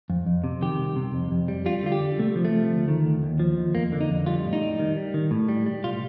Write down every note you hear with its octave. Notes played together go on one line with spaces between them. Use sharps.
F2
F2
C3
D#3 G4
C2
C3
F2
F2
G3
G3 F4
D3 F4
G4
G3
C3 A3
F3
A3
F3
D2
D#3
D2
D#2
F3
D#2
F2 A#3
D3
D#4
F2
G3 F4
A2
D#4
G3
D#3
G3
D#3
A2
G3
G3
C2 F4